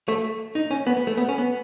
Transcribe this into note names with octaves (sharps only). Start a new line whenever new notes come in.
A3
D#4
C#4
B3
B3
A3
B3
C#4
B3